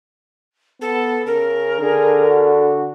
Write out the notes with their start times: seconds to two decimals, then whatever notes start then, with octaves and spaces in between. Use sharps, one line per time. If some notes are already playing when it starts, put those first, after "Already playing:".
0.81 B3 A4
1.26 C#3 A#4
1.80 D3 G#4
2.26 F#4